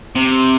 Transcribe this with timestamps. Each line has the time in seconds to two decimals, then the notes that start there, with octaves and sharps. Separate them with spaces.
0.16 C3